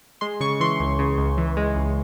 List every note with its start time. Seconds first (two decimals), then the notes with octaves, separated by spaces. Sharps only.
0.21 G#3 C6
0.40 C#3 C#6
0.60 E3 C6
0.80 C#2
0.99 C#3
1.18 C#2
1.37 E3
1.57 G#3
1.76 C#2